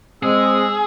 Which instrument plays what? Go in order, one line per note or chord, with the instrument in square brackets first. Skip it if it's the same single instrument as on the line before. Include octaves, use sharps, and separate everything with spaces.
[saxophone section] G#3 [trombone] C4 [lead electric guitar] G#4 [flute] E6